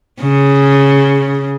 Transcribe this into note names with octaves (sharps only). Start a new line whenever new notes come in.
C#3